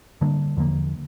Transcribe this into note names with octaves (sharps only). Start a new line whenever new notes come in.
D3 G3 A#3 D4
E2 D3 F3 A#3